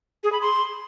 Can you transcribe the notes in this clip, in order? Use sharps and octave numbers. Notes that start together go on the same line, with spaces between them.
G#4
B5
C6